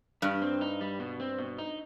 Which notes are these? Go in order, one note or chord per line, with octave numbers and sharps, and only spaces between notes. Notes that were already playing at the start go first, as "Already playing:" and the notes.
G2 G3
C4
D#4
G3
B2
C4
B2
D#4